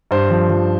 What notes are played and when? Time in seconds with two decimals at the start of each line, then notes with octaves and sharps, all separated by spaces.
0.11 G2 C5
0.30 F3
0.50 F3